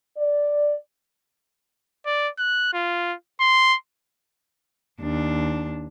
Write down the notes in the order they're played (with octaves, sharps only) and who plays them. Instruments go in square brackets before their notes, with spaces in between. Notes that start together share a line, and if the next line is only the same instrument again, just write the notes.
[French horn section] D5
[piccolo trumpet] D5
F#6
F4
C6
[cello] D#2 D4